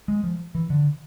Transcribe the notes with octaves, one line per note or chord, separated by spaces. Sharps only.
G#3
F3
E3
D3